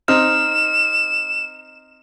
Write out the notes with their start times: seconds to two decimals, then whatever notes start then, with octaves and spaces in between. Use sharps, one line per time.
0.08 C4 D#4 F6 E7